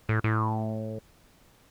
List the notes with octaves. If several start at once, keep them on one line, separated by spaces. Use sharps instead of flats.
A2
A2